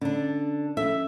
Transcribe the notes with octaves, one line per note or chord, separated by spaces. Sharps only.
D3 C#4 D4
F3 C#4 A4 E5